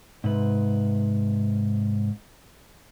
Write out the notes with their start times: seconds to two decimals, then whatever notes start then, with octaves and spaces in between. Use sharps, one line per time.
0.24 G#2 C3 B4